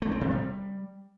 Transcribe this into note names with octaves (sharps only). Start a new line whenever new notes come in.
A3
C4
C3
G3